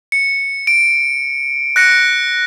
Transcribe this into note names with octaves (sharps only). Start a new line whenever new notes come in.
C#7
D7
F#6 A#6 C#7